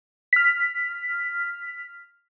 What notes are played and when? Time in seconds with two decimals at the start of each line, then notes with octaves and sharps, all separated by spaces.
0.33 F6 B6